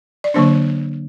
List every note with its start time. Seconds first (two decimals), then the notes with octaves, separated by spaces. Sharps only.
0.24 D5
0.34 D3 F#3 A#3 D4 C5